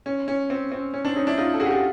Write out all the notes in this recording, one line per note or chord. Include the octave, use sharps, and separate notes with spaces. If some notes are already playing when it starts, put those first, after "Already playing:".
C#4
C#4
C4
C4
C#4
C4 D4
C#4 D#4
D4 E4
D#4 F4
A4
F#4 G#4
G4
F#4 G#4